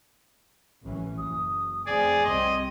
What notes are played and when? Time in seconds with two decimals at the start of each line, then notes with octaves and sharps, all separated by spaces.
0.83 A1 E3 C#4
1.18 F#1 D#6
1.86 F2 A3 C4 G#4 D5 G#5
2.24 C2 C4 D#5 C6